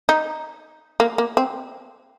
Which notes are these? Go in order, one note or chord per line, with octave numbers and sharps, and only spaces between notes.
D#4
A#3
A#3
C4